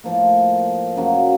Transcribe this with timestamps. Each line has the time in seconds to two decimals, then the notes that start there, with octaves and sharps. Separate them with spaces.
0.04 A2 F3 A#3
0.96 F#2 C#3 F#3 A#3